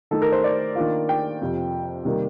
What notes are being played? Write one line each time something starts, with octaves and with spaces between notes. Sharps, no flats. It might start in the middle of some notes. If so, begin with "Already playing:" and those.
D#3 A3 D#4 A4
A#4
C5
D5
D#3 A#3 D4 F4
G5
F2 C3 F3
C3 D#3 G3 A#3